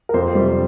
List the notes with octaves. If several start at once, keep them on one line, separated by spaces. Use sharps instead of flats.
A#4
F2 C5
C3 G3